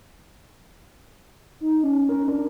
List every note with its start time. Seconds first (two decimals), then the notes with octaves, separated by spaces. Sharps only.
1.61 D#4
1.83 C#4
2.09 A#4
2.28 D4